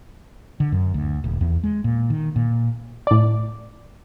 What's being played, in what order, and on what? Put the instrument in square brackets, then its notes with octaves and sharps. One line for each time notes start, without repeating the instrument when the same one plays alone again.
[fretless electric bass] D3
F#2
D2
D#1
E2
G#3
A#2
D#3
A#2
[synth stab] A2 D5